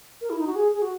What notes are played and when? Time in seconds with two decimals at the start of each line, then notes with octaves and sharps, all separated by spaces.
0.21 A#4
0.30 E4
0.39 D#4
0.47 F#4
0.56 G#4
0.73 G#4
0.82 F#4